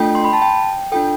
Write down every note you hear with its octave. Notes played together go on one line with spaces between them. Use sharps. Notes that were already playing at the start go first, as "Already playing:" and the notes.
Already playing: A3 D4 F4 A4 G5
C6
B5
A5
G5
D4 F4 A4 G5